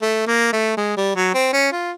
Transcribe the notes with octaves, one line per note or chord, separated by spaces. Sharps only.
A3
A#3
A3
G#3
G3
F#3
C4
C#4
F4